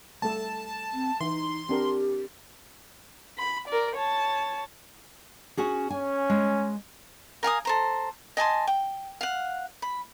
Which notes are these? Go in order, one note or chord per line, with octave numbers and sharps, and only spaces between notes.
G3 A3 A4 A5
C4
E3 D#4 C6
C4 D4 G4 A#4
B5
A#4 D5
C#5 A5
C#4 F#4 G#4
C#4 G#5
G#3
A#4 F5 G#5 D#6
A4 C5 A#5
D#5 G#5 A5 C6
G5
F5 F#5
B5